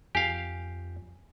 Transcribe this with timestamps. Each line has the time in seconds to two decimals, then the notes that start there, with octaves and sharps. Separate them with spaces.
0.15 F2 G4 F5 G#5